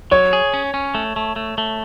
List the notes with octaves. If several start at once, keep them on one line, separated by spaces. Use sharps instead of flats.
F#3 C#5
G#4
C#4
C#4
A3
A3
A3
A3